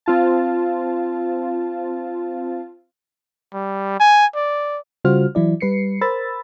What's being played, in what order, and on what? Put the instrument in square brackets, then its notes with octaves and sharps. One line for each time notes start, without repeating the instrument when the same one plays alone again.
[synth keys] C4 F4 A5
[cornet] G3
G#5
D5
[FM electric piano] C#3 G3 F4 F#4 C5 F6
E3 F#3 E4 D5
G3 B4 C7 C#7
A#4 C5 B5 E6 A6